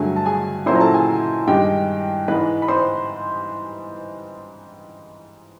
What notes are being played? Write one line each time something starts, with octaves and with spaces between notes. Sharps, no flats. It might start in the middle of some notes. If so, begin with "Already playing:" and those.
Already playing: G2 D3 F#3 A3 G#4 G#5
A5
G#4 G#5
A#2 F#3 A#3 C#4 E4 C5 C6
A#5
A4 A5
G#4 G#5
G2 D#3 G#3 G4 G5
G#2 E3 G#3 B4 B5
B5
C5 C6